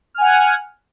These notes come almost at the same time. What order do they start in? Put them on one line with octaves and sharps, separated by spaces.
F6 G#5 F#5